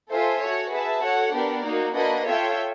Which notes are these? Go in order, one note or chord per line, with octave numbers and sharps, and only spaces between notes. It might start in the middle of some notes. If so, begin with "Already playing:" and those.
F4 A4 C5 E5 G#5
F#4 A4 C#5
G#4 B4 E5 A5
F#4 A4 C#5 F#5
B3 D4 G4 A#4 D5
A#3 D#4 F#4
A#3 D4 F#4 B4 D#5
F4 A4 C#5 E5 G5